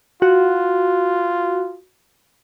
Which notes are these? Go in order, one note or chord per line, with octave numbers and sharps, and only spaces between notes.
F4 F#4